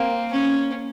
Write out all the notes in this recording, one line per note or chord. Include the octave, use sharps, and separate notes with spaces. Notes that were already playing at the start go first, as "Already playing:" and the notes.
Already playing: A#3 C4
C#4